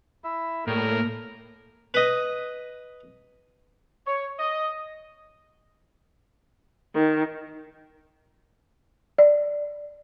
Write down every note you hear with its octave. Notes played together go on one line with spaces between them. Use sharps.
E4 E5
A2 G3 A#3 A4 A#4
B4 D#5
C#5
D#5
D#3
D5